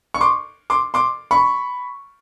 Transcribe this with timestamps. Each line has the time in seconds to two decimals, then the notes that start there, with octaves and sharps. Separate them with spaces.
0.14 C#6
0.21 C6 D6
0.70 C6 D6
0.94 C6 D6
1.31 B5 C#6